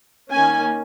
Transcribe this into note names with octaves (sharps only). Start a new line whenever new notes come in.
D#3 A#3 C#4 G#5